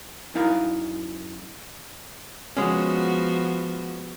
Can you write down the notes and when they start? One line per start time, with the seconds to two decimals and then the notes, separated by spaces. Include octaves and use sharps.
0.35 F#2 D#4 E4 A#4 F5 A#5
2.57 F3 G#3 B3 C#4 F#4